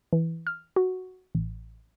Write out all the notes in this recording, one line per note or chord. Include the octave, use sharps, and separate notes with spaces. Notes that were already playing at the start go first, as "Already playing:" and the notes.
E3
F6
F#4
A1